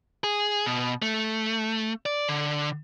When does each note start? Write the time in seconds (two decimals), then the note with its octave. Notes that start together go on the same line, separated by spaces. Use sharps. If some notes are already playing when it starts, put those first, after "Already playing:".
0.24 G#4
0.66 B2
1.02 A3
2.06 D5
2.29 D3